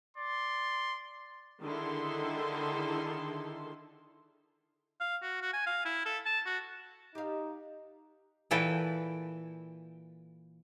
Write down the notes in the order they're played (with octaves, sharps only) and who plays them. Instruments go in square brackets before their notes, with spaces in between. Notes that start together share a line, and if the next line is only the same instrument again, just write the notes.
[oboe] D5 [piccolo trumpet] C6
[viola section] D3 D#3 E4 G#4 A4 C6
[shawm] F5
F#4
F#4
G#5
F5
E4
A4
A5
F#4
[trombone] D#4 [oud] G4 F5
[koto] A#2 E3 E4 A4 B4 G5